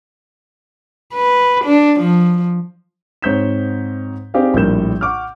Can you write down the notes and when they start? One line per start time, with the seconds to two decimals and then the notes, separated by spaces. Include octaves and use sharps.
1.14 B4
1.65 D4
2.00 F3
3.22 G#2 C4 C#5 G6 B6 E7
4.34 C4 D#4 G4 G#4 D5 F5
4.54 A#1 A2 G3 A#4 G6 E7
5.01 F#5 C#6 D6 F6